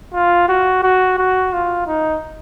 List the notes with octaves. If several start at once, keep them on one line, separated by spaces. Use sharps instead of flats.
F4
F#4
F#4
F#4
F4
D#4